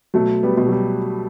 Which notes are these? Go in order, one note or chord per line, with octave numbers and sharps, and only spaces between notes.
B2 F#3 A3
G3 B3
B2
F#3
G3